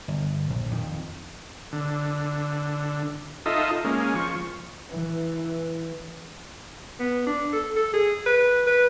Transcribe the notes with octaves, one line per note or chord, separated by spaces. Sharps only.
G1
A#1
F2 D#3
D3
D#4 F4 A4 D#5 E5
G#3 A#3 C#4
F3 C#6
E3
B3
D4
A4
A4
G#4
B4
B4